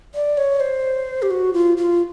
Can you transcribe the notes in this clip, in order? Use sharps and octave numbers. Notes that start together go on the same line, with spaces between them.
D5
C#5
C5
G4
F#4
F4
F4